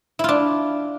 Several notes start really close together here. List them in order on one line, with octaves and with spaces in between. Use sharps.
E4 F4 D4